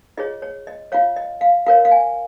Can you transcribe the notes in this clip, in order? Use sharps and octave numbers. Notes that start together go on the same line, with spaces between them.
F4 G#4 C#5 D#5
C#5
D#5
F4 C#5 F5
D#5
F5
F4 A#4 C#5 F5
F5
G#5